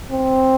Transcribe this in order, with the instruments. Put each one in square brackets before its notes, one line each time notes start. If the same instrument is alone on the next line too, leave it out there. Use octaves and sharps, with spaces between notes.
[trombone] C4